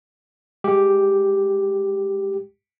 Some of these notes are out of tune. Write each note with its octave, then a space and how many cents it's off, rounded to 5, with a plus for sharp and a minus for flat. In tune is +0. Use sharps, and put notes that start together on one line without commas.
G#3 +0 G4 +0